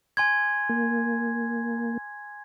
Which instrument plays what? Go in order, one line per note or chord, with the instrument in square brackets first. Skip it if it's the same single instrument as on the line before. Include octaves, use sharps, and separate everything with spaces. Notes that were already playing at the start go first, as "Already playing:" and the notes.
[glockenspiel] G#5 C6 G#6
[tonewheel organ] A#3